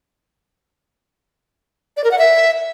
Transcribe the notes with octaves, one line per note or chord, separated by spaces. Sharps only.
D5
A#4
F#5
E5